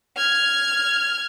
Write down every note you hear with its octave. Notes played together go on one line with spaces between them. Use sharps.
F6 G#6